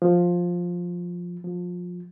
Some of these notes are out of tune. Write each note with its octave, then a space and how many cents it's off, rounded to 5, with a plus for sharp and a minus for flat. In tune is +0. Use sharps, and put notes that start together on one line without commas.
F3 +10
F3 +25